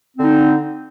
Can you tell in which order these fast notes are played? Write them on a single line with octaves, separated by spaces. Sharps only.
C4 D3 D#4